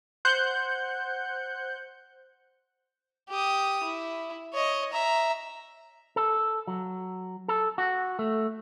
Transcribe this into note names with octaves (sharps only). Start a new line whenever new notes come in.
C5 F#5 F#6 G6 C#7
G4 D#6
E4
C#5 D#5
E5 A#5
A4
F#3
A4
F#4
A3